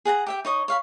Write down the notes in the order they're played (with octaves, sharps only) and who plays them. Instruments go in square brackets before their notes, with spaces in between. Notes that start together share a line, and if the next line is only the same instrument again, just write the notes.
[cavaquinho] G#4 F#5 A5 A#5
G4 E5 G5
D#4 C#5 D#5
C#5 F5 B5